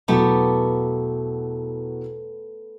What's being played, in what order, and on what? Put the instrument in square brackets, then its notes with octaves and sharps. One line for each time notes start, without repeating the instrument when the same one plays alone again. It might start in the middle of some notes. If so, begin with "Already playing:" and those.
[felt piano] E2 B2 F#3 [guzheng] A3 B3 G4